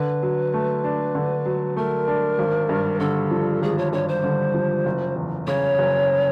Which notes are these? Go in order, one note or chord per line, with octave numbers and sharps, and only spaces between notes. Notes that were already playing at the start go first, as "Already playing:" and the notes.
Already playing: D3 B4
F#3
A3
D4
D3
F#3
A3 A#4
D4
G#1
G2
D3 A4
F3
G#1 G#4
C#5
G2 C#5
C5
D3
F3
F#1
E2
C#3 C#5
F#1